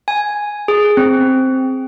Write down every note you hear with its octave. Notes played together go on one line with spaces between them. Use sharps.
G#5
G#4
C4